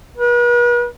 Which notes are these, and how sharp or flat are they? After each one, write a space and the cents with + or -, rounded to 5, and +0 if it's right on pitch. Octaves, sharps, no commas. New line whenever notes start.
B4 -40